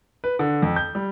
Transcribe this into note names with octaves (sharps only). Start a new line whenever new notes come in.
B4
D3
F2
G6
G3